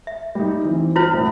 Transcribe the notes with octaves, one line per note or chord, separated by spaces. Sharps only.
E5
G3 D#4
E3 C4
E4 F4 C5 F6
C2 A2